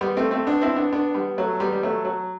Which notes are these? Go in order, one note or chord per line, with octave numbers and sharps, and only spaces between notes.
G3 B3
A3 C4
A3 C4
B3 D4
C4 E4
B3 D4
B3 D4
G3 B3
F#3 A3
G3 B3
G3
F#3 A3
F#3